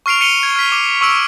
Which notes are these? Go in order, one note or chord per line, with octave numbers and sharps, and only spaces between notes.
C#6 F6 C7 D7 F7
C#7 D#7 F7 G7
G#6
F6 B6
D6
C#6 E6 D7